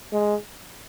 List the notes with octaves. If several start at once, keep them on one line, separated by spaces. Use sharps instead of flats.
G#3